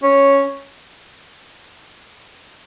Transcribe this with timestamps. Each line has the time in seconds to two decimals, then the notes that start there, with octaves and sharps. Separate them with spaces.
0.03 C#4